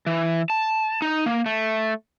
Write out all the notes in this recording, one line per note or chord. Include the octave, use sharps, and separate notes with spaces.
E3
A5
D#4
A#3
A3